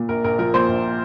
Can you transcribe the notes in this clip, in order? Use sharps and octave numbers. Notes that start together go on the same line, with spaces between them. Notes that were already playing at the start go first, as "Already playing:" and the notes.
Already playing: A#2
A#1 A#4
A#1 A#4
F3 A#4
A#2 C5
A#1